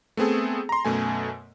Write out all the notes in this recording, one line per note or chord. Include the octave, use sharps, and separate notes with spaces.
A3 B3 C4 G#4 A4
A#5 C6
F#2 B2 A3 G#5